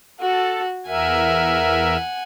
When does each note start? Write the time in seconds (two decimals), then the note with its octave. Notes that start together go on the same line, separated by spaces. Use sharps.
0.20 F#4 A4
0.87 E2 A#4 E5 F#5 G#5